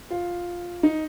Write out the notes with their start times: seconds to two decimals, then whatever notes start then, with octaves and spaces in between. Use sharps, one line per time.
0.10 F4
0.83 D#4